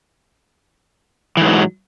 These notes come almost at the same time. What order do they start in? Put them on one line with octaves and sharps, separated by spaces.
E3 G#2 F#3